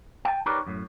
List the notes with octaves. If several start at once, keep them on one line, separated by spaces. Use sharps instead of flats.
G5 A5
D#4 G4 A#4 B4 C#5 D5
F#2 A2